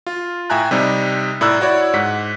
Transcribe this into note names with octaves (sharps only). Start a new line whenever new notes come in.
F4
A2 E5 G5 G#5 A#5 F#6
C3 G3 D#4
A2 E4 D5 A#5 E6 F#6
E4 F#4 C#5 D5
G#2 F#5 B6